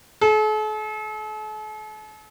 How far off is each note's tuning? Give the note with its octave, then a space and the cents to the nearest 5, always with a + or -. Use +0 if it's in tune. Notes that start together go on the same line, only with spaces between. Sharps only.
A4 -45